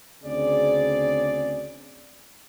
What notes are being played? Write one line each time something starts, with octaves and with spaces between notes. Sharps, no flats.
D2 C#3 C4 G#4 D5